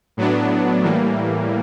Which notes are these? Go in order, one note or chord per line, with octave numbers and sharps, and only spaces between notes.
A2 F#3 B3 D4
A2 E3 G3 A#3